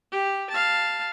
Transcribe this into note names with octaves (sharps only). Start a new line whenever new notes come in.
G4
F5 A5